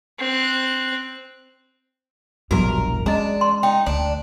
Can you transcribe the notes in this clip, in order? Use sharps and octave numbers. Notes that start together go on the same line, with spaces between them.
C4 F#6
E1 A#1 E2 G2 F#3 F#4 A#4 A#5
G#3 C#4 D4 D#5 A#5
C6
D#4 G5
D2 D4